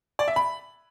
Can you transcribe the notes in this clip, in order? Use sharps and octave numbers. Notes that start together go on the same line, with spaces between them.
D5
E5
B5